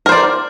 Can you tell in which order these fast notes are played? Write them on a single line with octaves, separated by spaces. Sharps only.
A#4 C5 D5